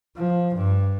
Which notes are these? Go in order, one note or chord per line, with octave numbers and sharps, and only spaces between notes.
F3
G2